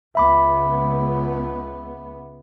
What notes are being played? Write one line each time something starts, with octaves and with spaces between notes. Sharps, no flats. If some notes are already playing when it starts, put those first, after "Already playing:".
C#2 B3 E5 B5 D6